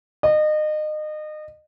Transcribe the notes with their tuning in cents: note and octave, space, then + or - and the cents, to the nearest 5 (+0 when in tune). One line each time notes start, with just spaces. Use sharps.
D#5 -30